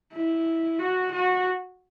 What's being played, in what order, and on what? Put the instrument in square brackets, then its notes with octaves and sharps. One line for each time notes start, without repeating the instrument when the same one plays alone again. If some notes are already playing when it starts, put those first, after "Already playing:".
[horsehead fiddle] E4
F#4
F#4